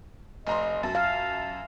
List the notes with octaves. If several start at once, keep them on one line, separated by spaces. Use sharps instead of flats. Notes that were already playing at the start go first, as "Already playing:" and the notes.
F1 D#5 A#5 C6
F#2 A5
F5